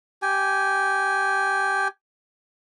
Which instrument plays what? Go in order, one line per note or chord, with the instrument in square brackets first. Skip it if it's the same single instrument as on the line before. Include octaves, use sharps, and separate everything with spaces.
[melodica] G4 G#5